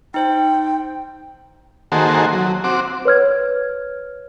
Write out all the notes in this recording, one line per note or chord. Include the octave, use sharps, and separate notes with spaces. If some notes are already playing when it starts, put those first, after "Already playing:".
D#4 C5 G5
D#3 A#3 F#4 G#4 A4 C5
F#3
C4 F#4 D6
B4 C#5 F6 G#6